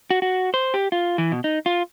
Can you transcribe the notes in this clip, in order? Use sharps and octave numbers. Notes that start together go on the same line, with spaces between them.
F#4
F#4
C5
G4
F4
E3
B2
D#4
F4